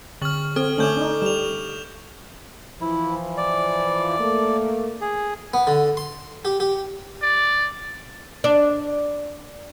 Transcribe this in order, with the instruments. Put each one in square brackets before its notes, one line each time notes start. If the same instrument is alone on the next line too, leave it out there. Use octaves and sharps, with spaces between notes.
[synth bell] D3 F6 [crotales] C#6 F#7
[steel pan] C4 [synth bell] A4 [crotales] F6
[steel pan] D3 A3 C#4 [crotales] D6 G6 F#7
[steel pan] D4 D#4
[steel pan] G3 [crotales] E7 F7
[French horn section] E3 F3 [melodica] E4
[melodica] D5
[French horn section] A3 A#3
[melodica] G#4
[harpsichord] B3
D3
C6
G4
G4
[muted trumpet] D5
[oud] D4